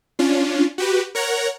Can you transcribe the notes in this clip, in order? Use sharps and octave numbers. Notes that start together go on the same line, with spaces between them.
C#4 D4 F4
F#4 G4 B4
A#4 C#5 F#5 A#5